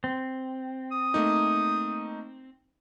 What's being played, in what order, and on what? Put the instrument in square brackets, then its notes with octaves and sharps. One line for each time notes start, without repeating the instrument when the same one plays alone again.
[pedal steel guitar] C4
[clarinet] D#6
[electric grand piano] A3 A#3 D#4